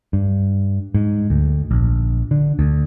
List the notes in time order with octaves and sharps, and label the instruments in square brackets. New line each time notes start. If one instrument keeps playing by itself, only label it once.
[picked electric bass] G2
G#2
D2
A#1
D3
D2